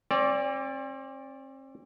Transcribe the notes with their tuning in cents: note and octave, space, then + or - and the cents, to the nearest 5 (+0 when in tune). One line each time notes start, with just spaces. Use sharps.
C4 +40 D5 -10